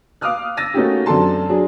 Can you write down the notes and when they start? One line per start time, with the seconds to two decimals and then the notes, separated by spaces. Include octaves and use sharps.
0.21 F5 D6 D#6 F6 F#6
0.57 E6 A6 A#6 D#7
0.74 A3 A#3 C#4 D#4 F#4 G4
1.06 F#2 C4 D4 A4 A5 C6
1.49 F#3 D4 G#4